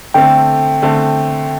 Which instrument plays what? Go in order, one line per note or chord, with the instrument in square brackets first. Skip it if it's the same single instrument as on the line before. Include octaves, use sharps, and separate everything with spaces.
[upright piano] D3 A3 C4 A4 [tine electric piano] G5
[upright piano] D3 A3 C4 A4